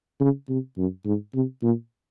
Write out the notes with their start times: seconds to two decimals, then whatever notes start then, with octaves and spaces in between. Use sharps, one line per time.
0.21 C#3
0.49 C3
0.78 F#2
1.06 G#2
1.34 C3
1.63 A#2